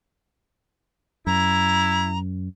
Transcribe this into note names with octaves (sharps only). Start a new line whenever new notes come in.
F#2 E4 A#5